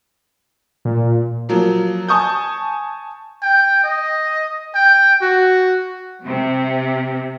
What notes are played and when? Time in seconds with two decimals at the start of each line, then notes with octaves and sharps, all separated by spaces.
0.85 A#2
1.49 F3 F#3 A#3
2.08 G#5 A5 C#6 D#6 G6
3.42 G5
3.84 D#5
4.74 G5
5.22 F#4
6.25 C3